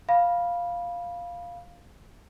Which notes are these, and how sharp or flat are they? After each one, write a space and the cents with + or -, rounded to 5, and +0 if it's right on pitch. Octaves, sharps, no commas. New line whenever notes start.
F5 +0 B5 -20